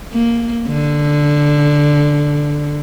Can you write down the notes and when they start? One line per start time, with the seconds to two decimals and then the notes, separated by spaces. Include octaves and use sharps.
0.13 A#3
0.67 D3